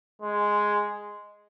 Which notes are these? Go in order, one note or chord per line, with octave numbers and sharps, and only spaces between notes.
G#3